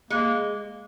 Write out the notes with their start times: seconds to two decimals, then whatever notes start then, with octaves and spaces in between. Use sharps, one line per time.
0.10 G#3 A#3